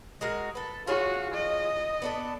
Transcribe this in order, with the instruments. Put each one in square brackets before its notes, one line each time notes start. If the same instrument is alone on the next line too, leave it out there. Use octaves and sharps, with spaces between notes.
[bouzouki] G#3 F#4 A#4
A4 B4
[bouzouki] F4 G#4 C#5 [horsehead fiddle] F#4
[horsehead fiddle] D#5
[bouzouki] B3 D4 A4